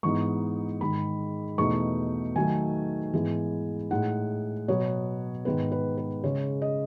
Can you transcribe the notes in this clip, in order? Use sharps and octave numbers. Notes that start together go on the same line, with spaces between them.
G#2 E3 B3 D#4 C#6
G#2 D#3 G#3 B5
E2 B2 A3 D#4 C#6
D#3 F#3 A3 D#4 G#5
G#2 E3 G#3 B3
A2 G#3 D#4 F#5
B2 F#3 B3 C#5
G#2 D#3 G#3 B3 B4
B4
B4
C#3 G#3 C#4 C#5
D#5